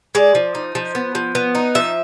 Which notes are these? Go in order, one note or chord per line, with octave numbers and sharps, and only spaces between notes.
G#3 D5
F3
D#4
F3
B3
F3
B3
D#4
F3 E5